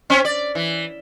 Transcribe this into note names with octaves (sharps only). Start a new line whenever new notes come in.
C4 C#4
D5
E3